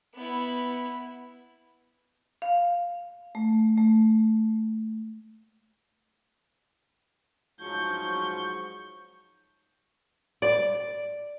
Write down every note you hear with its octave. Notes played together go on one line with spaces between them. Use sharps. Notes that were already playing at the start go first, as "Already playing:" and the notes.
B3 E4
F5
A3
A3
G#2 F3 F#3 C#6 G6
D5